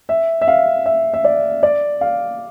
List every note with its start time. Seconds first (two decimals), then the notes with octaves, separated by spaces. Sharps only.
0.09 E5
0.41 E5
0.48 F5
0.86 E5
1.13 E5
1.24 D5
1.63 D5
2.01 F5